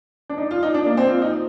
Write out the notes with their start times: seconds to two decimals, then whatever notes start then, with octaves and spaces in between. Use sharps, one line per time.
0.29 D4
0.38 D#4
0.51 F4
0.63 D#4
0.74 D4
0.86 A#3
0.97 C4
1.09 F4
1.22 D#4